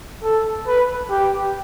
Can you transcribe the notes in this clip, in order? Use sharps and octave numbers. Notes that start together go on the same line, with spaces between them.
A4
B4
G4